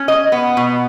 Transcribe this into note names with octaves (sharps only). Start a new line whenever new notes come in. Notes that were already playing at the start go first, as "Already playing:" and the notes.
Already playing: C#4
D#5
B3
B2